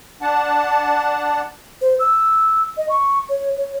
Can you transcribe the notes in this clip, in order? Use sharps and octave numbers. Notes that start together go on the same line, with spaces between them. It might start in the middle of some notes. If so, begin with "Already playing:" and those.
D4 F#5 A5
C5
E6
D#5
C#6
C#5
C#5